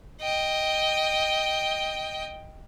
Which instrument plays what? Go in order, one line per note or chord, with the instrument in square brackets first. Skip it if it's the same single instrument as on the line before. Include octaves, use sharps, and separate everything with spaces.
[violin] D#5 G5